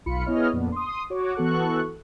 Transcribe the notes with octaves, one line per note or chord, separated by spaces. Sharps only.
B1 F4 B5 C#7
B3 E4 G#4 C#5 D#5 F6
F2 A#2 B3 D4
C6 D#6
F#4 C#5 D6
E3 B3 F#4 A4 C#6 F#6